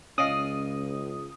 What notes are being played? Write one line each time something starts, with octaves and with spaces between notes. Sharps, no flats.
C#2 C#4 D5 D#5 F5 D#6